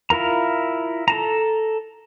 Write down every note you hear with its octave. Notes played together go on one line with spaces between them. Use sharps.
E4 F4 A#4 A#5
A4 A5 A#5